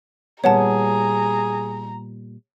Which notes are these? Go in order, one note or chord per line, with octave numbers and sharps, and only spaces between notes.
A#2 G3 B3 G#4 C#5 F#5 A5 A#5